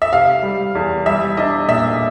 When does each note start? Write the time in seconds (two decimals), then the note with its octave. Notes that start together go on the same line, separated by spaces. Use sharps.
0.02 E5
0.12 C3 F5
0.43 G3
0.75 E2
1.06 G3 E5
1.37 D4 D#5
1.68 A#2 E5